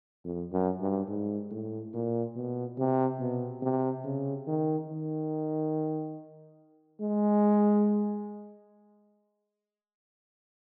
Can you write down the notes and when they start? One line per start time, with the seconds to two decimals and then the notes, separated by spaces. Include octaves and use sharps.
0.24 F2
0.52 F#2
0.81 G2
1.08 G#2
1.51 A2
1.93 A#2
2.36 B2
2.78 C3
3.19 B2
3.62 C3
4.04 C#3
4.47 D#3
4.89 D#3
7.01 G#3